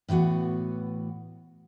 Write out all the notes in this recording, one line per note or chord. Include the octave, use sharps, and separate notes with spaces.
A2 E3 B3 F#4 F#5